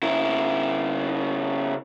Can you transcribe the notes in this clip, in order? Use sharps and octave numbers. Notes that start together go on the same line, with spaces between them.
C#3 E4